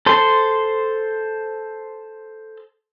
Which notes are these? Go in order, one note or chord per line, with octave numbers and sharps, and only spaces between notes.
A4 C5 C6